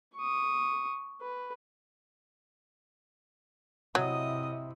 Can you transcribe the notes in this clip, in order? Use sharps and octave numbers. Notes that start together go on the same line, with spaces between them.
C#6 D#6
B4
C3 F#3 E4 D#5 D#6